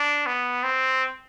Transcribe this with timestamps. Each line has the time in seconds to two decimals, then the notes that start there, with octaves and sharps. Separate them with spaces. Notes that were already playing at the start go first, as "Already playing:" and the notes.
Already playing: D4
0.26 B3
0.64 C4